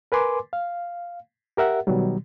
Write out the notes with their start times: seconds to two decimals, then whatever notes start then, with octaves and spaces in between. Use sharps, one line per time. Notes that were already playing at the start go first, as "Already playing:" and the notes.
0.12 A#4 B4 G#5 C6 D6
0.53 F5
1.57 G4 A#4 E5 F#5
1.87 B2 D#3 F#3 G3